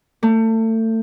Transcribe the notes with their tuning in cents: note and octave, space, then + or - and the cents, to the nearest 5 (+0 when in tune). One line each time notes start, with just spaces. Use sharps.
A3 +30